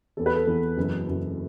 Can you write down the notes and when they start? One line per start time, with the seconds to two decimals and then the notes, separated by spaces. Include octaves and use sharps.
0.17 E2 E3 A4
0.26 B4
0.35 A4
0.47 E2 E3
0.77 F#1 F#2 E3
1.07 F#1 F#2 E3